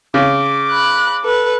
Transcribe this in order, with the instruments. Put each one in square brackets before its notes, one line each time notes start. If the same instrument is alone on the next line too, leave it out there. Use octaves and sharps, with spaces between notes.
[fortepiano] C#3 [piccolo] D6
[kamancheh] B5 F#6
A4 B4